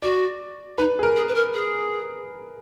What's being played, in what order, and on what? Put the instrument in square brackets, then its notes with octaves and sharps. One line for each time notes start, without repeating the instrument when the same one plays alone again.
[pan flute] F#4 [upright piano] D5
[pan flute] D#4 [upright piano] B4
[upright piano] G#4
A#4
[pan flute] G#4
B4
A#4
G#4